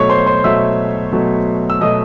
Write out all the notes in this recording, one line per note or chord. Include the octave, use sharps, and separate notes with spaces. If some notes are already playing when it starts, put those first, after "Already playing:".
Already playing: B2 F#3 A3 C#5 C#6
C5 C6
C5 C6
B2 F#3 A3 E5 E6
B2 F#3 A3
E6
B2 F#3 A3 D#5 D#6